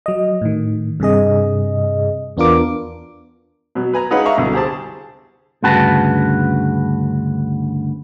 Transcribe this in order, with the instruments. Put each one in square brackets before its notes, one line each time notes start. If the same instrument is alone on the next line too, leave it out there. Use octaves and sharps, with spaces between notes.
[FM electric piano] F#3 D#5
A2 D#3
G2 C3 G#4 D#5
E2 B3 D4 F4 A#4 D6
[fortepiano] B2 F#3
B4 G#5 A#5
G#3 C#4 D#4 B4 F5 F#5
E5 F5 A#5 C#6
C2 B2 D3
G4 G#4 C5 A5
[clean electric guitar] D2 G2 C#3 F#4 B4 A5